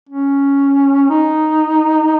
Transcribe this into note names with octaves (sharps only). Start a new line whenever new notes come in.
C#4
D#4